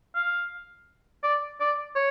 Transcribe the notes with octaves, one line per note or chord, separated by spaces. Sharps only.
F5
D5
D5
C#5